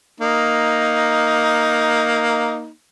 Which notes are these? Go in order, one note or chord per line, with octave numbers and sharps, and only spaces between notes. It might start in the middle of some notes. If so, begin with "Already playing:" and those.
A#3 D#4